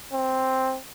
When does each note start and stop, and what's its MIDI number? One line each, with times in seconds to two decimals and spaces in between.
0.13 0.76 60